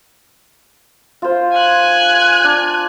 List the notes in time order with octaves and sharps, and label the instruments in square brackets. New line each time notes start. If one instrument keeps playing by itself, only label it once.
[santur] F4 C5
[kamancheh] G#5 F#6
[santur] D4